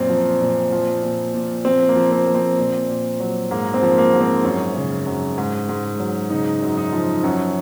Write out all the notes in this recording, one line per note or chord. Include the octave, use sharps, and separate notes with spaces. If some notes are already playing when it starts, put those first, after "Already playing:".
Already playing: F#2 A#2 C4
F3
A#2
F3
A#2
A#2
F3 C4
A#3
F3
C4
F3
C4
A#2
A#2
F#3
G#2 A#3
C4
F3
A#3
G#2
C4
F#2 C#4
C#3
F#2
G#2
G#2
F#3
C#3 D#4
F#2
D#4
F3
F#2 C#4